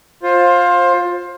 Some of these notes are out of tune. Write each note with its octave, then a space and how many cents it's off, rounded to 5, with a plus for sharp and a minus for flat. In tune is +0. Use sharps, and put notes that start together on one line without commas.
F4 +15 C5 +20